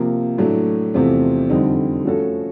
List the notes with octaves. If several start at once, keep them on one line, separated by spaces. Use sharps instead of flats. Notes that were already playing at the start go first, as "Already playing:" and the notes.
Already playing: C3 F3 A#3
A2 F#3 A3 D4
E2 C3 F3 A3 C4
F2 D3 G3 C4 D#4
F3 A3 C#4 F#4 A4